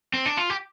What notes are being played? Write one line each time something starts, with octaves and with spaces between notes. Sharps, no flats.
C4
D4
F4
G4